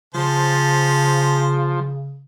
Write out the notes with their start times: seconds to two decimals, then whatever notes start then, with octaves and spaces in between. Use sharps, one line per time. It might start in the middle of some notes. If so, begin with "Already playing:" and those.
0.15 C#3 F3 C#4 C5 A5